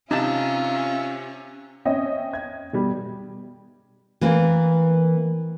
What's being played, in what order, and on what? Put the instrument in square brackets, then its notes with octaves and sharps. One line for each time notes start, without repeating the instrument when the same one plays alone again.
[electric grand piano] C3 [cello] C#4 [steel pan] D#4 A5 [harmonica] F4 E5
[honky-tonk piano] C4 C#4 C#5 D#5 E5 G5
G#6
B2 G3
[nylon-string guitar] E3 A#3 C4